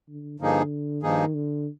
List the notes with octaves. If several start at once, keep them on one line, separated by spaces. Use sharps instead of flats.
D3
G2 D3 F3 A#3 D#4 G#4
G2 D#3 F3 A#3 D#4 G#4
D3